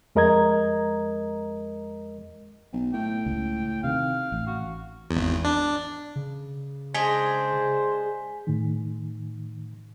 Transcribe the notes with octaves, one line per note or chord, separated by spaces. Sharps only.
F2 G#3 A#4 D#5 A#5 G#6
B1
A2 G5
C#2
C3 D#3 F5
A1
F#4
G#1 E2
D4
C#3
G#3 D4 G#4 C5 G#5 B6 G7
A2 D#3